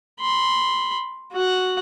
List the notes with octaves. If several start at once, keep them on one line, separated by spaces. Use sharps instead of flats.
B5 C6
F#4 F#5